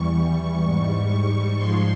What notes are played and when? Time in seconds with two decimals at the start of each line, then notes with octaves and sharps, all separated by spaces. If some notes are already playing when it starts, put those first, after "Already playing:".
Already playing: E2 E3 G3 C#6
0.12 C#6
0.60 G#2 G3 C#6
1.09 C#6
1.57 G#2 F3 G#3 C6